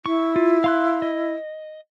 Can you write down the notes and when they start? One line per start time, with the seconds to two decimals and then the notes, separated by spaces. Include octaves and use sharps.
0.06 E4 C#6
0.36 F4
0.64 F5 C6 F#6
1.02 D#5